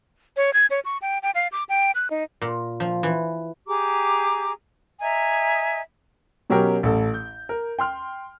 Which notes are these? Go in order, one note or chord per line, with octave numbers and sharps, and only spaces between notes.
C#5
G#6
C#5
C#6
G5
G5
F5
D6
G5
F#6
D#4
A#2
F3
E3
G4 G#4 A#5 D6
D#5 E5 G#5 A#5
B2 F#3 C#4 G4 A#4
A1 A4
G6
A#4
G5 C6 F6